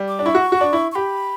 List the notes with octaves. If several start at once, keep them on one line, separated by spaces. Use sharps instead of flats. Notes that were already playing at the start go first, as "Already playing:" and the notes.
Already playing: G3
D6
D4
E4 C#6
F#4
F#4
D4
E4
C#6
G4 B5